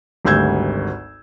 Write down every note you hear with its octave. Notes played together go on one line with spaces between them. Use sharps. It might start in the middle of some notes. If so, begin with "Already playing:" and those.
G#1 D2 G3 E6 G6 G#6